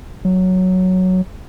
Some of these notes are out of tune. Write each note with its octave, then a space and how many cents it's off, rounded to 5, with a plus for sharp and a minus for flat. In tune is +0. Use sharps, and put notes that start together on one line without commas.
F#3 +0